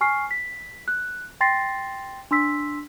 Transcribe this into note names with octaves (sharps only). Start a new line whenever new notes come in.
G#5 C#6 F6 C7
B6
F#6
G5 C6 A6 A#6 C7
D4 C6 E6 B6